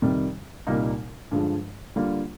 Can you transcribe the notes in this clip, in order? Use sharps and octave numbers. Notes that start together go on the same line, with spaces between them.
F2 C3 D#3 G3
C2 A#2 G3 A#3 D#4
G2 D3 F3 G#3
D3 G3 A#3 F4